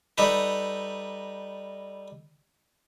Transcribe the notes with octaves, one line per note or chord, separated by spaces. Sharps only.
G3 D#4 A4 B4